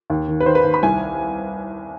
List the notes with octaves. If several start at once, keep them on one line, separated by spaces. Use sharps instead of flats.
D#2
D#3
B4
D#3 C5
B4
D#2
B5
C2 G#5